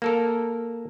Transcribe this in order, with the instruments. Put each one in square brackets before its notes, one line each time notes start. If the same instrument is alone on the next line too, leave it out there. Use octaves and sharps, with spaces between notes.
[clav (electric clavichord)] A#3 A4 A#4